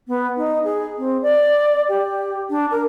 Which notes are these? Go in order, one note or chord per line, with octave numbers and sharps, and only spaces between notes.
B3
D#4
G#4
C4
D5
G4
D4
A#4